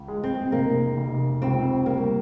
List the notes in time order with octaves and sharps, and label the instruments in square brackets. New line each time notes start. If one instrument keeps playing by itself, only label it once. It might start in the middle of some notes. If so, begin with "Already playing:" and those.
Already playing: [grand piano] C#2
G#3
[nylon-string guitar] C4
[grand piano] F1 [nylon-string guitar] A#3
[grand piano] F1
[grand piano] C#2 [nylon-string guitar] C4
[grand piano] G3 [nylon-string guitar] A#3